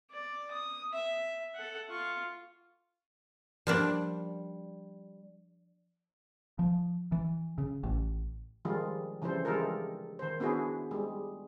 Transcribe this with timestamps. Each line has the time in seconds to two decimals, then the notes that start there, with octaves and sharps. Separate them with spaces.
0.11 D5
0.51 D#6
0.93 E5
1.55 A4 F#5
1.89 F4 C#6
3.67 F3 G3 A#3 D4
6.59 F3
7.12 E3
7.58 C#3
7.83 A1
8.65 D#3 F3 G3 G#3 F4
9.22 C#3 E3 F3 G3 A4 C5
9.45 E3 G3 G#3 F4 A4 A#4
10.19 D#3 C5
10.40 B3 D4 E4 F#4 G#4
10.91 G3 G#3